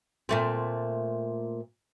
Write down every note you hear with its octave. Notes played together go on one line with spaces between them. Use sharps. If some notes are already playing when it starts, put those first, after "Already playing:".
A#2 A3 C4